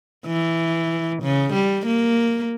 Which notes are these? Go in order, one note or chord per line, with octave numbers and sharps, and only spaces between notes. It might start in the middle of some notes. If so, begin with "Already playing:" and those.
E3
C#3
G3
A#3